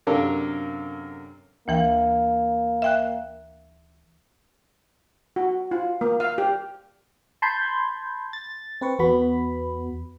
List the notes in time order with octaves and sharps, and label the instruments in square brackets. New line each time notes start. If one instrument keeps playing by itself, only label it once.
[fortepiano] F#2 C3 D4 A4 A#4 F5
[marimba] D2 E3 G5 [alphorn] A#3
[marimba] E5 G5 F#6
[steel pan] F#4
F4
A#3
F5
G4
[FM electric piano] A5 B5 C6 G6 G#6
A6
C4 B4 C#6
E2 B3 F#4 B5